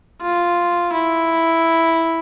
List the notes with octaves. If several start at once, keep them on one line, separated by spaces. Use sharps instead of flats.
F4
E4